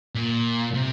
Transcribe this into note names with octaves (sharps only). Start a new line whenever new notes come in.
A#2
C3